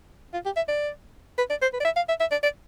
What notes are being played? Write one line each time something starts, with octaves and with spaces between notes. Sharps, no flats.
F4
G4
E5
D5
B4
D5
C5
B4
D5
E5
F5
E5
E5
D5
D5